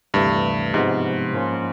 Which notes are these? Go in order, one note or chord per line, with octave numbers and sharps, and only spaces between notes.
D2 G2 C3 E3 A3 D4
G#2 C3 F3 G#3 B3
G#2 F3 A#3 C#4 F4